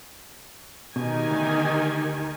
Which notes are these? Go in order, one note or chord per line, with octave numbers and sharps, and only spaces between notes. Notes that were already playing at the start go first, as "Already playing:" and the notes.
B2 D#3 G4 G#5
D2